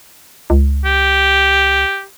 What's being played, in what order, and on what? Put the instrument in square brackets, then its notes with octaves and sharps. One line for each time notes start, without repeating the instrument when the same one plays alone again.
[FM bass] C#2
[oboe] G4